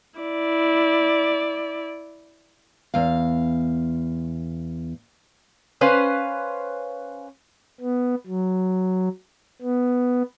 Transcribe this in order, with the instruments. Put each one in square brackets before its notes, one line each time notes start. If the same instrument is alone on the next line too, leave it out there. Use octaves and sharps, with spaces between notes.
[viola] E4 D5
[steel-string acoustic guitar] E2 F5
[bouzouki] C#4 B4 C5 F5
[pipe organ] B3
F#3
B3